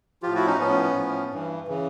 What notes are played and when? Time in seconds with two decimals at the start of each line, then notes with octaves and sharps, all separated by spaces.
0.23 A2 F3 F4 G4
0.35 E4 F#4
0.47 C#4 D#4
0.59 A2 F3 B3 C#4
0.95 A2 F3
1.31 G2 E3
1.67 C#3 E3